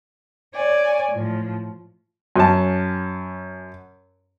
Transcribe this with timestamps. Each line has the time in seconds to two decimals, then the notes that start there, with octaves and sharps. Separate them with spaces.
0.56 C#5 D5 G#5
1.11 A2 F3
2.36 F#2 C#4 A5